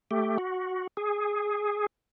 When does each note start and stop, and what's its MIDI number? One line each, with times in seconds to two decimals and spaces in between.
0.11 0.38 57
0.11 0.38 67
0.38 0.87 66
0.97 1.86 68